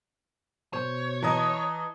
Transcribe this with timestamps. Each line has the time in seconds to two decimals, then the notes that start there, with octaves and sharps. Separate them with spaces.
0.73 B2 C5 C#5
1.22 E3 D#5 A5 A#5 D#6